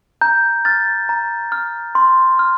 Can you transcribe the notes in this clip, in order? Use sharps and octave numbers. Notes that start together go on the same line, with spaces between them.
A#5 G6
F6 A6
A#5
F6
C6
F6